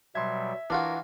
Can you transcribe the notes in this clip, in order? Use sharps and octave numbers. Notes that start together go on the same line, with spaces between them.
B2 F#3 G3 E5 C6 G#6
E3 D4 F4 F#4 A#4